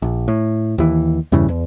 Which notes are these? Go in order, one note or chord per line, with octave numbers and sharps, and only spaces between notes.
A#1
A2
D#2 E3
E2 G2 C#3 E3
E2